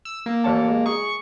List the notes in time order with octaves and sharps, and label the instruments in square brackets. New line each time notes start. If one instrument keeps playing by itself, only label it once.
[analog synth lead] E6
A#3
[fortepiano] A1 C#5 A5
G#3
[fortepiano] G#4 [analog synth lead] C#6